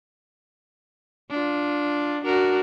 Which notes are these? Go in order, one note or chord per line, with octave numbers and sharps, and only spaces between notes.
D4 F4
D4 F#4 A#4